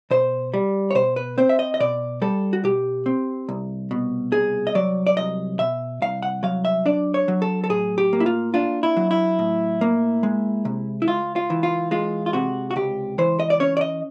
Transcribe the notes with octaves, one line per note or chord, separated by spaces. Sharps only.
B2 C5
G3
C#5
B2 C5
B4
C4 C5
E5
D#5
D#5
B2 D5
G3 A4
F#4
B2 G4
C4
C2
B2
C2 G#4
D#5
F#3 D5
D5
C2 D#5
B2 E5
C2 F5
F#5
F#3 F5
E5
D4 D5
C#5
F#3
A4
A4
A2 G#4
G4
A#3
E4
F4
D4 F4
E4
F#3
E4
A2
A#3
G#3
C3
E4
C#2 F4
F4
E3
F4
G#3 F4
F4
C3 F#4
F#4
C#2 G4
E3 C5
D#5
D5
C#4 C#5
D5
D#5